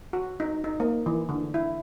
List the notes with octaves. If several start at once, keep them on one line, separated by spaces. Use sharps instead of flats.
F#4
D#4
D#4
A#3
E3
D3
E4